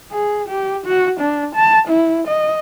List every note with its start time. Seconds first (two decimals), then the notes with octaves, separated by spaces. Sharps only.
0.11 G#4
0.48 G4
0.86 F#4
1.20 D4
1.55 A5
1.88 E4
2.28 D#5